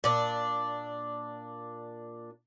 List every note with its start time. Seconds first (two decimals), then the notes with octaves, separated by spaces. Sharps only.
0.04 A#2 D4